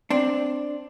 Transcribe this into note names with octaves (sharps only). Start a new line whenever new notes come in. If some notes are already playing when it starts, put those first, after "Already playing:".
C4 D4